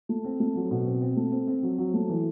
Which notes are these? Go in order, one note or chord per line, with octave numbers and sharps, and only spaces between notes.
A3
C4
A3
F#3
B2
C4
C4
A3
C4
C4
F#3
F#3
A3
E3